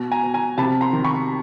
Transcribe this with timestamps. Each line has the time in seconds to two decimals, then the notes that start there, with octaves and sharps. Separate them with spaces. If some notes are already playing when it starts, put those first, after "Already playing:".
Already playing: B2
0.12 G#5 A#5
0.23 B2
0.34 G#5 A#5
0.58 C3 A5 B5
0.81 A#5 C6
0.93 D#3
1.04 B5 C#6